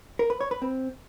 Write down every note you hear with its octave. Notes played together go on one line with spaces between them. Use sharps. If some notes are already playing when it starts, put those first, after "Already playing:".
A#4
B4
C#5
B4
C4